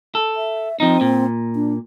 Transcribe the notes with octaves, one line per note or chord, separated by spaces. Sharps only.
A4
E5
F3 C4 D#4
A#2
D4